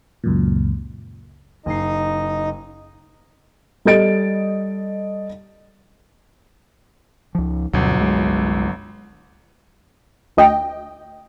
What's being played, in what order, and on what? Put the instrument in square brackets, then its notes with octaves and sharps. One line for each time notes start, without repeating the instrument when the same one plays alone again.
[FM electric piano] C#2 F#2 A#2
[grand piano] F#1 C7 [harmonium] D#4 D#5
[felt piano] G3 A4 D#5 A6 D7
[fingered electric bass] C#2 F3
[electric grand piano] G1 F#3 [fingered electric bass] D2 B2
[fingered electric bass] C2 G#3
[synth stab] D2 D#5 G5